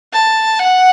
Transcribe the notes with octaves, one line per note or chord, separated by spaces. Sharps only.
A5
F#5